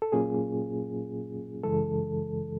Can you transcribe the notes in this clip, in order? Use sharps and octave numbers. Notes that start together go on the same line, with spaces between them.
A4
A#2 F#3 A#3 C#4 F4 G#4
F#2 C#3 E3 G#3 A4